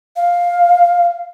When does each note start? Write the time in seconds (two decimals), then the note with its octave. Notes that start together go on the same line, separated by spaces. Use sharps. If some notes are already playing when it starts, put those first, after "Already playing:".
0.16 F5